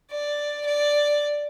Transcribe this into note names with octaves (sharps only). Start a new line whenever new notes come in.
D5
D5